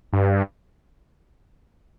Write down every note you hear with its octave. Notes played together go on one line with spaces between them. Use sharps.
G2